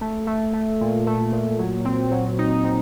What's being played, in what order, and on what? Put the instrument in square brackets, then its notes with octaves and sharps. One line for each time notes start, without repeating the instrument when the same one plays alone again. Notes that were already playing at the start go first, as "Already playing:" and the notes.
[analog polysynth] A3
A3
A3
A#2
A3
A#2
F#3
C4
F#3
D#4
C4